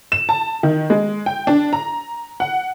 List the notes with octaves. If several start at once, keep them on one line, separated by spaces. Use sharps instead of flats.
E7
A5
D#3
G#3
G5
D4
A#5
F#5